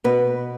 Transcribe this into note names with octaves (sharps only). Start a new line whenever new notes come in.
B2 B4